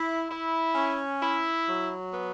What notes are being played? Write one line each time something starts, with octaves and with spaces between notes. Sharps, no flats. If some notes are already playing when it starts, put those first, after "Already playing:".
Already playing: E4
E4
C#4
E4
F#3
B3